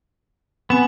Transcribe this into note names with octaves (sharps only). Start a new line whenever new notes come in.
B3 C4 G#5